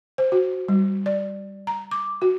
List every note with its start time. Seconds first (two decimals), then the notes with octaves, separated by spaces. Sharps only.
0.18 C5
0.32 F#4
0.68 G3
1.06 D5
1.67 A#5
1.91 D6
2.22 F#4